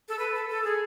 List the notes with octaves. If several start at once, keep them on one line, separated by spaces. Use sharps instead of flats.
A4
B4
A4
A4
G#4